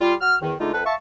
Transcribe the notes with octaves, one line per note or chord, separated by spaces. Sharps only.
G3 F4
F#4 F6
E2 D#3
D3 G#3 A3 D#4 F4
F2 A4 B4
E5 F5 A5 C#6